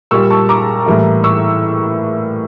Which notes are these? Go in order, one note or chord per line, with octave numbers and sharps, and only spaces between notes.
A#2 G3 A#3 C#6 E6
A5 C#6
A#5 D6
A2 E3 G3 A#3
C#6 E6